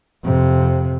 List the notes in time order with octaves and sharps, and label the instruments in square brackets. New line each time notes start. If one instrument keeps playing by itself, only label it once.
[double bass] F2 C3